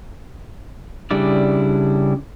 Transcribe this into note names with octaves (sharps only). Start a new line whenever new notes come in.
C#3 G3 D4 E4 D5